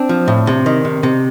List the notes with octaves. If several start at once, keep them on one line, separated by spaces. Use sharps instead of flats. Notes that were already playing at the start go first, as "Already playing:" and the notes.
Already playing: C4 D4
F3
A2
C3
D#3
C3
C3